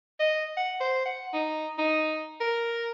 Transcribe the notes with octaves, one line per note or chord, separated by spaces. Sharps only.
D#5
F#5
C5
F#5
D#4
D#4
A#4